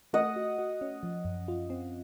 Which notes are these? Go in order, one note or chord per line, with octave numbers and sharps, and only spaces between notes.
A3 D#5 F#5
F#4
F#4
C#4
F3
F#2
F4
C4